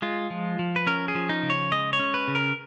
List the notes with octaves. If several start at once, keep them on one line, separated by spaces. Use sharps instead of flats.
G#3 F4
F3
F3
B4
C#4 A#4
G#4
F3
D#4
C#3
C#5
G#3 D#5
C#5
C#4
B4
C#3
A#4